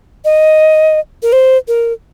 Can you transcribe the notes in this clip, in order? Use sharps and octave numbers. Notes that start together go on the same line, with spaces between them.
D#5
A#4
C5
A#4